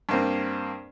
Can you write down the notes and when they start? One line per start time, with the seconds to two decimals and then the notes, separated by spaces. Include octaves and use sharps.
0.09 G2 A#3 C4